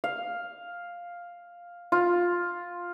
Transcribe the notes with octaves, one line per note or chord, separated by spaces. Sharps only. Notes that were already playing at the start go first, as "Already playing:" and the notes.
F5
F4